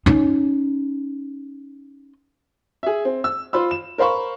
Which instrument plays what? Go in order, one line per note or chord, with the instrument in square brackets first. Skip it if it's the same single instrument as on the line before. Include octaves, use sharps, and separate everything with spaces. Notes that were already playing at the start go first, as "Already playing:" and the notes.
[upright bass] C#4 D#4
[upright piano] G#4 E5
C4
E6
F4 C5 B5 E6
E7
A#4 C5 F5 B5 C#6